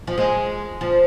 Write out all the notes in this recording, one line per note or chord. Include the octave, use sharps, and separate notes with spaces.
F3
G#3
F3